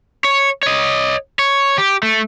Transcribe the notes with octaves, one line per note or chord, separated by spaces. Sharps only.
C#5
C#5 D#5
C#5
G4
A3